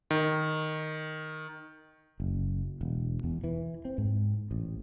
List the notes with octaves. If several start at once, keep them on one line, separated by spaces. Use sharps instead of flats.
D#3
F#1
E1
E2
E3
C4
G#2
A1